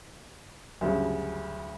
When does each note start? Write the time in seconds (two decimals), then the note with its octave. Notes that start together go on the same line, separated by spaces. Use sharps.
0.81 D2 G2 C#3 F#3